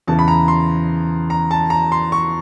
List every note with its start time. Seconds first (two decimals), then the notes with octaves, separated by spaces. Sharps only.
0.08 E2 C#3 E3 A5
0.19 B5
0.28 A#5
0.48 C6
1.30 A#5
1.51 A5
1.70 A#5
1.92 C6
2.12 C#6